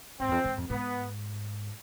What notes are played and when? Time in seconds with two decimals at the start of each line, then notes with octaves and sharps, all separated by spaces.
0.20 G#2 C4
0.28 E2
0.32 F2
0.44 G#2
0.57 F2
0.70 G#2 B3